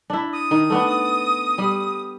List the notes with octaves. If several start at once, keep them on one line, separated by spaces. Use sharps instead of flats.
D4 E4
D#6
D#3
A3 B3 D4
G3